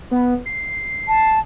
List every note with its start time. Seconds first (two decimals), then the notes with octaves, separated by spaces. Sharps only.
0.11 B3
0.46 C7
1.08 A5